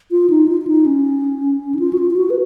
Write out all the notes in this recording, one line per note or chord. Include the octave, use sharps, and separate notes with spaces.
F4
D#4
F4
F4
D#4
C#4
D#4
F4
F#4
F4
F4
F#4
B4